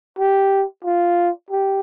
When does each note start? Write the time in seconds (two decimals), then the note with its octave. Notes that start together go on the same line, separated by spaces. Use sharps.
0.19 G4
0.84 F4
1.50 G4